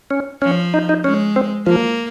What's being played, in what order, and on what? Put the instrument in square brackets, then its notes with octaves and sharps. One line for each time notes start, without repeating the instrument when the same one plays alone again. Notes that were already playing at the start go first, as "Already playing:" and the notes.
[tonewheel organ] C#4
[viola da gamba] F3 [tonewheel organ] C#4
[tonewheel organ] D#4
D#4
[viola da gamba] G#3 [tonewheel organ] C#4
[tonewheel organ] C4
[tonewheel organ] F3 [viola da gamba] A#3